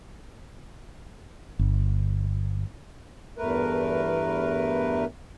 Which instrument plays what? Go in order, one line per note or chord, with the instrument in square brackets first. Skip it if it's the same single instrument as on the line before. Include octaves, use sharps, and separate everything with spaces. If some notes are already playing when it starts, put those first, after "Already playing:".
[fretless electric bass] G1
[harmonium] E2 G2 A3 A#4 B4